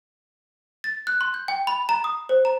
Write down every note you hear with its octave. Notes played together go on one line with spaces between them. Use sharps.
A6
F#6
C6
G6
G5
B5
A#5
D#6
C5
A#5